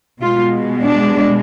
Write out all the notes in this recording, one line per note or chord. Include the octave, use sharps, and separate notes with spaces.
B2 G#3 F4
D4